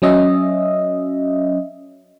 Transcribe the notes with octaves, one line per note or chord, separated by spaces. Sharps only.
F#3 C#4 D#5 E5